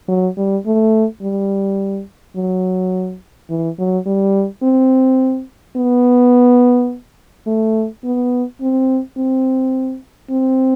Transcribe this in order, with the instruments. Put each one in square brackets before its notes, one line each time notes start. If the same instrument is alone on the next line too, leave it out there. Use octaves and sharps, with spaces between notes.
[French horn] F#3
G3
A3
G3
F#3
E3
F#3
G3
C4
B3
A3
B3
C4
C4
C4